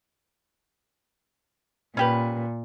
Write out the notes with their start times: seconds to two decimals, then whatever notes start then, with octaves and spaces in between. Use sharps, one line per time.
1.97 A#2 C#4 G4 B4